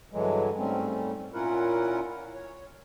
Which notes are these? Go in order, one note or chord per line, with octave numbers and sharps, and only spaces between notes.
G2 D3 E3 F#3 G#3
G#2 G3 A3 C4 C#4
A#2 C#4 E4 F4 A#4 F#5
C#5